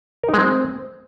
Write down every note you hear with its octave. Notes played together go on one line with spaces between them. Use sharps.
A#4
D#4
G#3
C4